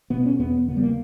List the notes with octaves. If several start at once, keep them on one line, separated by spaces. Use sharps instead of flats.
B2 B3
C#4
E2 B3
C#3 B3
G3
A#3